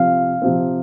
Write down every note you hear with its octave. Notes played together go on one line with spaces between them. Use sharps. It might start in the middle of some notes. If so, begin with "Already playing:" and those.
Already playing: C3 F3 C4 F5
C3 F3 C4